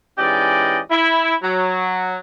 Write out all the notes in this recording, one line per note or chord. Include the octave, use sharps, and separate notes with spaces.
G#2 E3 C#4 G4 D5 D#5
E4
F#3